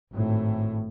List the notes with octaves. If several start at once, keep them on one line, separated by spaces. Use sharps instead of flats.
G#1 A2